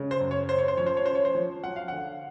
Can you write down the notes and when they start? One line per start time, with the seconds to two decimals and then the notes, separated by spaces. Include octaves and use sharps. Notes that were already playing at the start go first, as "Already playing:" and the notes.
Already playing: C#3 G#3
0.11 C5
0.20 F#2
0.31 C#5
0.49 C#4 C5
0.58 C#5
0.68 C5
0.77 F3 C#5
0.86 C5
0.97 C#5
1.06 C#4 C5
1.15 C#5
1.25 C5
1.35 F3
1.63 F#3 F#5
1.76 F5
1.88 D3 F#5